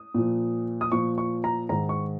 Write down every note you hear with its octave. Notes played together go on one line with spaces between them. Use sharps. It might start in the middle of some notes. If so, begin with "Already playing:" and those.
Already playing: D#6
A#2 F3
D#6
A#2 F3 C#6
C#6
A#5
G#2 D#3 A#5
C#6